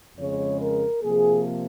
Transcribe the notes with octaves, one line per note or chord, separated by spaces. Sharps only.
F2 C#3 G#3 C#5
A#4
C3 F3 A#3 G#4